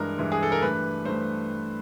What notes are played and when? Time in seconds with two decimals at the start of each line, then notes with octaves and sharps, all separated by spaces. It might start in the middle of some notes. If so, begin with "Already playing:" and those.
Already playing: G2 E3 G#3 A#4
0.18 G2 E3 G#3
0.32 G#4
0.43 A4
0.52 A#4
0.61 G2 E3 A3 B4
1.05 G2 E3 A3 C5